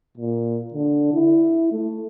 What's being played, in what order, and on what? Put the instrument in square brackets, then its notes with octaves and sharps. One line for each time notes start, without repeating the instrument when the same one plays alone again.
[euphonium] A#2
D3
E4
A3